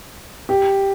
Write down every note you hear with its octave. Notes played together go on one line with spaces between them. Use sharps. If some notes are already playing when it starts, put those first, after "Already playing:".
G4